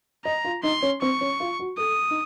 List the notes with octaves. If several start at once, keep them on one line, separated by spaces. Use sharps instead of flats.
D#5 A#5
F4
D#4 C6
C#4
C4 C#6
C#4
F4
F#4
A4 D#6
D#4